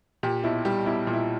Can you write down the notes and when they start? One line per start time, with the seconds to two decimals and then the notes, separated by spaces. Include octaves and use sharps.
0.23 A#2 G4
0.43 B1 E4
0.65 G3 G4
0.86 B1 E4
1.07 A#2
1.13 E4